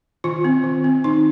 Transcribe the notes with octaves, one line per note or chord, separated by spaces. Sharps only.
D#3 F4
C4
D#3
C4
D#3 D#4